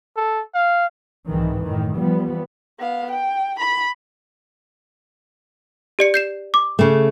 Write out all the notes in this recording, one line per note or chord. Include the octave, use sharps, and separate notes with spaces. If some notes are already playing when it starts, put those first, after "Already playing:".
A4
F5
C2 G#2 D#3 E3
F#2 A2 D#3
E3 F3 G3 B3
B3 F5
G5
B5
G4 D5 C#7
G6 C7 E7
D6
C#3 A3